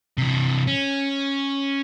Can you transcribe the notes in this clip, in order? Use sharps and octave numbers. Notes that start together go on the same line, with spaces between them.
C3 E3
C#4